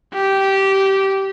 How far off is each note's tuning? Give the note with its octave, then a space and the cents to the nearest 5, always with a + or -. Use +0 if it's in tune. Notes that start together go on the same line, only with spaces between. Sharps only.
G4 -15